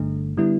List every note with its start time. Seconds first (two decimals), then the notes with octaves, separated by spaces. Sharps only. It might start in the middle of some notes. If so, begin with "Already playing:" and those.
Already playing: G1 G2 D3 A3
0.37 D3 G3 B3 E4